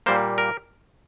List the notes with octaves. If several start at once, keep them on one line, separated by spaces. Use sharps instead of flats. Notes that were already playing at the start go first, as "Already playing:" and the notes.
A#2 G3 A#3 C5
A#4